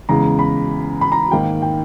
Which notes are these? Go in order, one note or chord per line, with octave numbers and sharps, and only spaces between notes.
E2 C#3 G#3 A#5
B5
B5
A#5
G#2 D#3 A#3 G5
G5